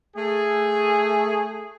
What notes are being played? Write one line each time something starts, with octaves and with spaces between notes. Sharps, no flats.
A3 G#4